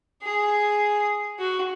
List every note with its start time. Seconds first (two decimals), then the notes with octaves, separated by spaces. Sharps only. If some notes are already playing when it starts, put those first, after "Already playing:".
0.23 G#4
1.39 F#4